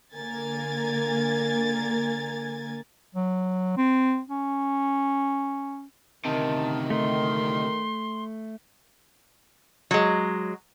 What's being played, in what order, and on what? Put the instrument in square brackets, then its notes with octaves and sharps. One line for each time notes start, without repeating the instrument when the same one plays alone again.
[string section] D3 A#3 A#4 G#5 G#6 A6
[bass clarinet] F#3
C4
C#4
[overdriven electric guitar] D2 C3 [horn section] D#3 [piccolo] A5
[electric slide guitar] A3 [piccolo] C6
[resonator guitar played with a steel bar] F#3 G#3